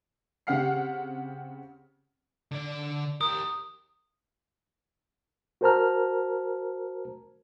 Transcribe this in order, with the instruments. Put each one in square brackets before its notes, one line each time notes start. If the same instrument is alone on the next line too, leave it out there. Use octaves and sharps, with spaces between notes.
[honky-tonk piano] C#3 C4 G4 F#5 F6 C7
[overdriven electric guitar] D3 D5
[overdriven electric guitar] G4 A#4 [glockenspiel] D#6
[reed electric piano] F#4 A#4 C5 A5 A#5 F6